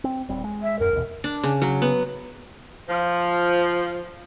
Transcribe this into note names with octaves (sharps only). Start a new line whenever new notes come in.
C4
D#1 G3 C4
G#3
E5
D#1 F#2 A#4
A1 D#2 B2
D4
C#3
F#3
B3
F3